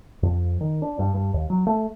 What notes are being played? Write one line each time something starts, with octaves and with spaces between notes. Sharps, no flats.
F2
D#3
D4
G2
G2
D#2
F#3
A3